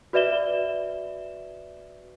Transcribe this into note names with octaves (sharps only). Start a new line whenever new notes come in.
F#4 B4 D5 E5 E7 G7